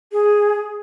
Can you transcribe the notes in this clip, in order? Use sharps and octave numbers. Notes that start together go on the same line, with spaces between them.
G#4